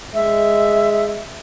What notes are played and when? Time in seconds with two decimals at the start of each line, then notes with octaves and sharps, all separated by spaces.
0.14 G#3 E5